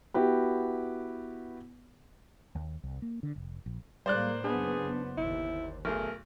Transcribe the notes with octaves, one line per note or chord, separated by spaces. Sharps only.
B3 E4 F#4 G4 B4
D#2
C2
A#3
D3
F1
A#1
A2 G3 G#3 A#3 C5 D5 F#6
F#1 B3 D4 G#4
G1 D#2 E4
B1 A3 G#4 A#4